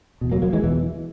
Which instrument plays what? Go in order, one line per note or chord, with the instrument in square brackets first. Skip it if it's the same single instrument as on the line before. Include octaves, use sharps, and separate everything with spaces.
[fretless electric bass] E2 B2
F#3 A#3
F#3 A#3
E3 G#3
E2 B2 E3